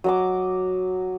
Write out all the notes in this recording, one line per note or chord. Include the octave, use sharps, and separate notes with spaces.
F#3 D#5 D6